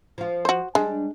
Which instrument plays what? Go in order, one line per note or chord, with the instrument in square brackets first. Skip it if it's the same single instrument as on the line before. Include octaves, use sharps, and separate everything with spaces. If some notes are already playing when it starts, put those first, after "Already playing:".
[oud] F3 F4
[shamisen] F#4 C5
[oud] G3 D4 [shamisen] G#3